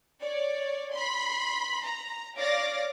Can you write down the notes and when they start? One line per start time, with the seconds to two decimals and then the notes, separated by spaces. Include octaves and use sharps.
0.22 C#5 D5
0.93 B5 C6
1.85 A#5
2.38 C#5 D5 F5 D6 A6 A#6